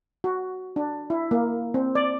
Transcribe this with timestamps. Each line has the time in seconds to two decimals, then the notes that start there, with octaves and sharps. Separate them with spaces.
0.24 F#4
0.76 D4
1.10 E4
1.31 A#3
1.74 C4
1.95 D5